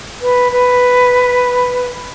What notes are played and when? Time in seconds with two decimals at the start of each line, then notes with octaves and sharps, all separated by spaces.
0.22 B4
0.52 B4